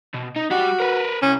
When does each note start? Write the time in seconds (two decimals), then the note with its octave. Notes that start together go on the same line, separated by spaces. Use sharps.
0.15 B2
0.36 D#4
0.51 G3 F#4 G4
0.80 A#4 B4
1.22 C2 C#4